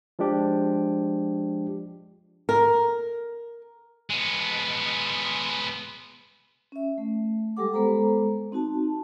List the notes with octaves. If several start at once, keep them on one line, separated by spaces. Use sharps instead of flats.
F3 G#3 D4 G4
A#4
G#3 B3
C#4 E5
A3
G3 G#3 G4 A4 F#5 D6
G#3 B3 A4 C5 A#5
C4 D#4 F#4 A5